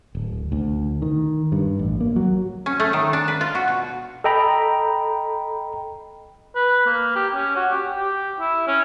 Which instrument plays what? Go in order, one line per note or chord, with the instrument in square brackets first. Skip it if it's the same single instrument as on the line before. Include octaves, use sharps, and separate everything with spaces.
[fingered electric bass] D1
D2
D#3
G2
A1
A#3
F#3
[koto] C#4
A3
D#3
D4
B4
F4
F#4
B2
[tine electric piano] A4 D#5 G5 A#5 B5
[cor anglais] B4
A#3
G4
C#4
F#4
G4
G4
E4
C#4